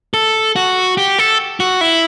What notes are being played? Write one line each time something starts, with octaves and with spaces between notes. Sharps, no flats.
A4
F#4
G4
A4
F#4
E4